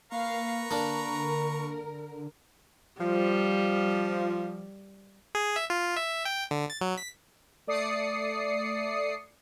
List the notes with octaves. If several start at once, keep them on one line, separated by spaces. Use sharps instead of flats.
A#3 B4 F5 A#5 C#6
D3 A#3 D4 A#4
F3 G3
G#4
E5
F4
E5
G5
D3
A6
F#3
B6
A3 D5 D#6 C7 C#7